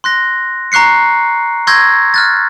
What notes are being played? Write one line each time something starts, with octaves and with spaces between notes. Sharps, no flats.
C6 F#6 A#6
A#5 C#6 F#6 C7 C#7
C6 C#6 E6 G6 G#6 A#6
F6 F#6 A6